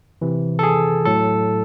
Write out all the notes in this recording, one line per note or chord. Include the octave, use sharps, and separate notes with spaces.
C3 E3
A4
G#4
A2 F#3 A4